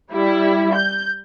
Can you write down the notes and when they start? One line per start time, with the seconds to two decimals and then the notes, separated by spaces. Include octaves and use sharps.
0.13 G3 E4
0.74 G6